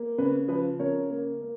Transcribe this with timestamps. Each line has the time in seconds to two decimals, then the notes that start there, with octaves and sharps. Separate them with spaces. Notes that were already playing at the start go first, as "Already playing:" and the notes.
Already playing: A#3
0.18 C#3 B4
0.48 F3 B4
0.79 C#3 A#4 C#5
1.10 A#3
1.41 A#3